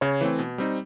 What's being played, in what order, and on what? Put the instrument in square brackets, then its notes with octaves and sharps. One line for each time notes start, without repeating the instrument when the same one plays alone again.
[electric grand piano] C#3 [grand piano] C#5
[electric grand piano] E3 A3 C4
B2
G3 C4 D#4